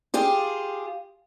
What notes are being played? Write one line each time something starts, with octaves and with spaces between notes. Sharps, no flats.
F4 G4 G#4